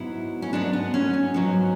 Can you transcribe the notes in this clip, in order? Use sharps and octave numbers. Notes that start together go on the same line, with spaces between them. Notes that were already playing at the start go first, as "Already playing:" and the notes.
Already playing: G#2 F#3 B3 E4
C#4
G#2 F#3 B3 D4
B3
C#4
C#4
G#2 F#3 B3